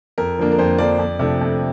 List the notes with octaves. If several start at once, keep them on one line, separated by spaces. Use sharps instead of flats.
F2 A#4
D3 F3 A#3 D4
A#4
F2 C5
D3 F3 A#3 D4 D5
F2
C3 F3 A3 D4
F2